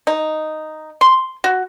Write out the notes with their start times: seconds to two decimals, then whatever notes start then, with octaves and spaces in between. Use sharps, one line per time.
0.07 D#4
1.01 C6
1.44 F#4